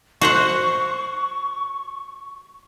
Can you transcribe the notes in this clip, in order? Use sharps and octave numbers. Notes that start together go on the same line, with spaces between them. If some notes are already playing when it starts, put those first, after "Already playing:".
F#4 C5 F#5 C#6